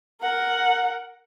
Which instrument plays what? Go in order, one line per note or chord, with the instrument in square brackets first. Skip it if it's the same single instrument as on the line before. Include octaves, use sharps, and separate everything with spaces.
[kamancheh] A#4 F#5